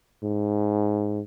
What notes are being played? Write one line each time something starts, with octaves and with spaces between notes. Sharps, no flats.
G#2